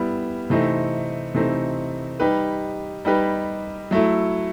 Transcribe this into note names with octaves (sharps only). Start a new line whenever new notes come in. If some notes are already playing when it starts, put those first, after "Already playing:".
Already playing: G3 B3 E4
C3 E3 A3 C4 D#4
C3 E3 A3 C4 D#4
G3 D#4 G4 B4
G3 D#4 G4 B4
F#3 A3 E4